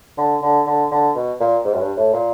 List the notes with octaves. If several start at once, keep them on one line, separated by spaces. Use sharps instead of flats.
D3
D3
D3
D3
B2
A#2
G#2
F#2
G2
A2
A#2